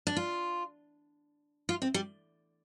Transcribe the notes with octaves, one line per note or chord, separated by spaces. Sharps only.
D4
F4
F4
C4
G3